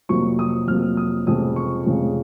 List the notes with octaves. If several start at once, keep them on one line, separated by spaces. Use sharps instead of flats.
F2 C3 F#3 A#3 C#6
D#6
F2 C3 F#3 A#3 F6
D#6
F1 F2 C#3 G#3 D#6
C#6
F1 F2 C#3 G#3